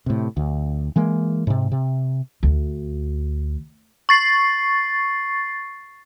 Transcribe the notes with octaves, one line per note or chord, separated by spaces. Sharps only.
A2 C3
D2
E3 G#3 A#3
G#2 C3
C3
D2
C#6 A6 C7